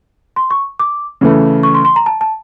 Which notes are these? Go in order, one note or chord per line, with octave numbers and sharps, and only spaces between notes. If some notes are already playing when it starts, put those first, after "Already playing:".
C6
C#6
D6
C#3 E3 A3
C#6
C6
C6
A#5
A5
A5